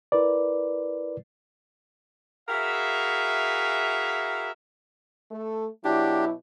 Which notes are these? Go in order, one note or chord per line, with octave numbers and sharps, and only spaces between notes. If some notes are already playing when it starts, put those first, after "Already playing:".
E4 A#4 B4 D5
E4 F#4 G#4 A#4 E5 F5
A3 A4
B2 F#3 D4 E4 G4